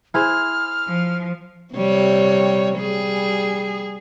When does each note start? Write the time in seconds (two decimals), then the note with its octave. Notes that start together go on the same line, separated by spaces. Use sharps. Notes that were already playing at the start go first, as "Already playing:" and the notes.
0.14 E4 G#4 C5 F6
0.87 F3
1.74 C3 G3 C#5
2.77 G3 G#4